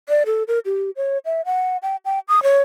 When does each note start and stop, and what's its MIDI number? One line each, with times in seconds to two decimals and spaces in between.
0.09 0.23 74
0.26 0.43 69
0.48 0.59 70
0.66 0.91 67
0.96 1.18 73
1.25 1.41 76
1.46 1.77 78
1.83 1.96 79
2.05 2.19 79
2.28 2.43 87
2.43 2.62 73